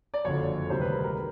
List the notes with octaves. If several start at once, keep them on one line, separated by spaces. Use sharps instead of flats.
D5
F#1 F2 D3 C#5
D2 C3 D#3 G3 C5
B4
A#4
A#4